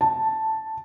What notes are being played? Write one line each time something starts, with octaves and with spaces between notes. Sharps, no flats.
A5